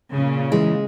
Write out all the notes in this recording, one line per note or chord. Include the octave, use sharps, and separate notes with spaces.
A#2 C#3
E3 G#3